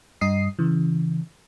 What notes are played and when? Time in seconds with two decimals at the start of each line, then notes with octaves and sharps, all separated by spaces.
0.21 G2 D#5 D#6 C7
0.59 C#3 E3